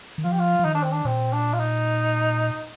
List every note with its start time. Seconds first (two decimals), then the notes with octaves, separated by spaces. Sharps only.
0.18 D#3
0.24 F3 F4
0.32 G4
0.39 F4
0.60 F3
0.65 D#3 D#4
0.74 D4
0.83 C4
0.92 D4
1.05 A#2 C4
1.33 D4
1.53 F4
1.60 D#4